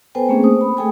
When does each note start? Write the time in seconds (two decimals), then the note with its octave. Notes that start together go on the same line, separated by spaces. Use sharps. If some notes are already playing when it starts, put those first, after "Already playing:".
0.15 B3 A4 B4 C5 G5 G#5
0.29 A3 A#3 C4 C#4 G#4
0.43 C5 D#6
0.61 B5
0.77 A3 G#4 A4 G5 G#5 D#6